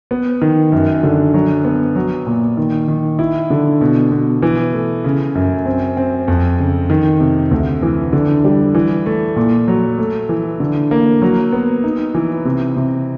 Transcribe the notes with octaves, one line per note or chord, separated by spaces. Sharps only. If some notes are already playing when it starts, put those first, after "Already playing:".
B3
D#3
F#2
D3
F#3
B3
F#3
A#2
D#3
D#3
E4
D3
B2
B2
E3
A3
C#3
F#2
C4
C4
F2
C#3
D#3
C3
D2
E3
D3
G3
E3
A3
A#2
F#3
A3
E3
D3
A#3
F#3
B3
D#4
E3
C3
C3